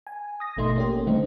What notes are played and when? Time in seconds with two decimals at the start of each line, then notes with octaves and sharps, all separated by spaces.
0.07 G#5
0.40 D#6 A#6
0.57 G#1 B2 A3 D#4 C6
0.76 A#3 C#4 G4
1.07 D3 D#3 G3 A3 C4 D#4